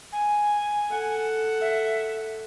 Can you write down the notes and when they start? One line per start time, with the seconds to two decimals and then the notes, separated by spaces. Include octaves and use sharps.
0.12 G#5
0.90 A4 F#5
1.61 E5